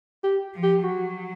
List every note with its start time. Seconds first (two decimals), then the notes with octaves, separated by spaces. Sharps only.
0.24 G4
0.54 F3
0.63 G4
0.84 F#3 F#4